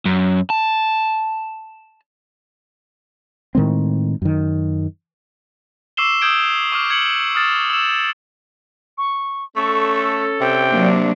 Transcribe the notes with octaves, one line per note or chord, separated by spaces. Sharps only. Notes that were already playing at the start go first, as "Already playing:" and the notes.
F#2
A5
A2 D#3 G#3 C4
F#2 D#3
C#6 D6 E6 C7 E7 G7
D#6 E6 G6 G#6 D7 G7
C#6 D6 F6
G#6 C#7 F#7
D#6 F6 A6 E7
E6 E7
C#6
A3 C#4 A4 C#6
C3 G5
F#3 A#3 D4